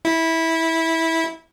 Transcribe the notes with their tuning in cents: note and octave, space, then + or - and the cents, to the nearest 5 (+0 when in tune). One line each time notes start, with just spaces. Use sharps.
E4 -15